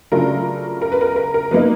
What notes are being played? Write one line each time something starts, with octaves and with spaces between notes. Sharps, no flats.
C#3 F#3 A3 D4 F4 A#4
A#4
B4
A#4
A#4
A#4
F#3 A#3 B3 D#4 B4